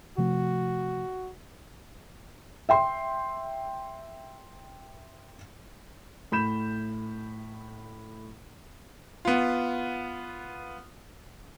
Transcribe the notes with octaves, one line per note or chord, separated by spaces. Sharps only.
C3 F3 A3 F#4
E5 G5 C6
A2 B5 G6 E7
B3 F4